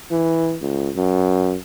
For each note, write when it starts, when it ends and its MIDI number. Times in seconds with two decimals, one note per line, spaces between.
0.11 0.57 52
0.61 0.90 37
0.96 1.56 42